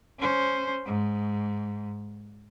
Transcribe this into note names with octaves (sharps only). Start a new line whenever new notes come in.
C#4 C5
G#2